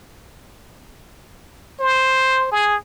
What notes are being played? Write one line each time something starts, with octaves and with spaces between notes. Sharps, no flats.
C5
G#4